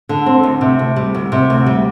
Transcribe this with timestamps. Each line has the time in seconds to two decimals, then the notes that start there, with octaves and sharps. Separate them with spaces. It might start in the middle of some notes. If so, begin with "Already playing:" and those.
0.09 D3
0.26 C4
0.43 D2
0.61 C3
0.79 D2
0.96 G3
1.15 D2
1.32 C3
1.50 D2
1.66 G3